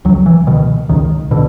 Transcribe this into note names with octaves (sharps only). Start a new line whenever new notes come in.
C#2 F#3
E3
B2 D#3
C#2 D#3
B2 D3